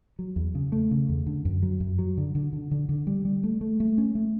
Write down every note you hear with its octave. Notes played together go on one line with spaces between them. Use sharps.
F#3
E2
C#3
A3
C#3
E2
D3
F#2
F#3
F#2
F#3
D3
D3
D3
D3
D3
G3
G3
A3
A3
A3
C#4
A3